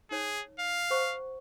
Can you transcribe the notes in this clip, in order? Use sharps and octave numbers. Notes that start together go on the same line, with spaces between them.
D#4 G#4 C#5 A5
F5
C5 F#5 C#6